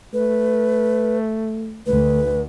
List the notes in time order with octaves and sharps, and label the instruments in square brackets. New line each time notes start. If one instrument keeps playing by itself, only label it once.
[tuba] A3 [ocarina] B4
[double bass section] D2 [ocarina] B4